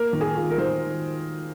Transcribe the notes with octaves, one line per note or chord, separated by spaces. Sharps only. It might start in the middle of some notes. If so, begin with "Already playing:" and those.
Already playing: A#3 A#4
D#3
G#4
F4
A#4
D#3 C5